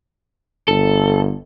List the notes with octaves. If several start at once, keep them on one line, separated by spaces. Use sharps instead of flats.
G1 A4